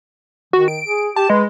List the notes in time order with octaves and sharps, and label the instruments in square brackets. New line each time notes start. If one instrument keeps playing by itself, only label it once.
[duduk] D#3 [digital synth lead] F#4
[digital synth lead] D7
[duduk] G#4
[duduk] G4 [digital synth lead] A5
[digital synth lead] G#3 [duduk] B4